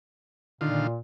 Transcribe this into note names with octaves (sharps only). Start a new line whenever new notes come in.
A#2 D3 D#3 F4